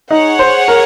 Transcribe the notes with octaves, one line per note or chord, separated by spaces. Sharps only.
D#4 G#4 C#5 F#5
C5
A#4